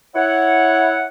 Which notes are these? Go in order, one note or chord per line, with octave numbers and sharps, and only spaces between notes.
E4 C#5 F#5